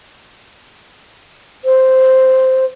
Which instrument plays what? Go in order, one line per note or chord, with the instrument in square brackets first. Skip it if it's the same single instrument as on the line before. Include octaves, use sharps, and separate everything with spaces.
[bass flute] C5